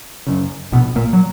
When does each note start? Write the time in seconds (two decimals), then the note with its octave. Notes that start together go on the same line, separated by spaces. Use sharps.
0.27 F#2 C#3
0.72 A#1 B2 B3
0.95 A#2 A#3
1.13 F#3